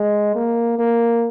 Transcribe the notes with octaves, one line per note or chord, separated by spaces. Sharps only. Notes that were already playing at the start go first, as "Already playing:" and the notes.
Already playing: G#3
A#3
A#3